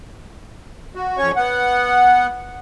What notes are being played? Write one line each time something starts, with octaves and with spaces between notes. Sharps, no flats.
F#4
F2 C#4 C#5 C#6
B3 F#5